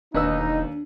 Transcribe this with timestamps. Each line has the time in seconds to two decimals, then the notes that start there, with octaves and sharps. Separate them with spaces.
0.14 E1 D#2 D4 D#4 B4 E6